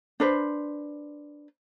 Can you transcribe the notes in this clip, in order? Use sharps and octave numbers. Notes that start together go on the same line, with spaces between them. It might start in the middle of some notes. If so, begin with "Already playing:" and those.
D4 B4 C5